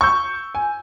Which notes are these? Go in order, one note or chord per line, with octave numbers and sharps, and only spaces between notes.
C#6 E6 G6
G#5